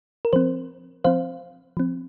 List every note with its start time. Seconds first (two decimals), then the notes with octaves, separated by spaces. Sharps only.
0.25 A#4
0.33 F3 C4 C5
1.04 F3 C4 C5 F5
1.77 F3 C4